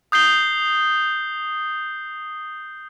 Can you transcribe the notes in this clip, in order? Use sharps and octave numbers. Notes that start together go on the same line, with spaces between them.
D#6 G6 C7 G7